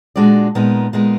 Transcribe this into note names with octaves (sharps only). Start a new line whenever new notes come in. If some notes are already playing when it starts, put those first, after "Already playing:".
A#2 G#3 D4 F#4 D5
A#2 G#3 B3 D#4 A#4
A#2 G#3 B3 D#4 A#4